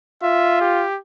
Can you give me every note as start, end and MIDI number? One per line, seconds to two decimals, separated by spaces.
0.23 0.86 65
0.23 0.60 76
0.61 0.98 67